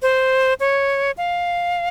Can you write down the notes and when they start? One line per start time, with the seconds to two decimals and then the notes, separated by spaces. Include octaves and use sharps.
0.02 C5
0.60 C#5
1.18 F5